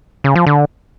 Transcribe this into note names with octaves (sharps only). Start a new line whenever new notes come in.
C#3
F3
D3